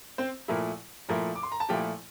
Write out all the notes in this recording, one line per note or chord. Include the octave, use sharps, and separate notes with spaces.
C4 C5
A#2 F3 A3 E4 A#4
A#2 F3 A3 E4 A#4
D6
C6
A#5
A5
A#2 F3 A3 E4 G4 G5